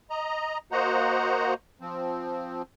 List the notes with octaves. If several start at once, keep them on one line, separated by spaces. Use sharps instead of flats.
D#5 A#5
A#3 F#4 C5 D#5 F#5 A#5
F3 C4